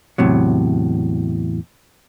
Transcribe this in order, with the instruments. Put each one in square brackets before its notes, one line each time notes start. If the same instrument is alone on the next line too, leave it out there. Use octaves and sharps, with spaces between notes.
[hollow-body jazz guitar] E2 A2 C3 F#3